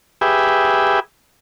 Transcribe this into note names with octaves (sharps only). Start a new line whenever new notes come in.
G4 G#4 B4 E5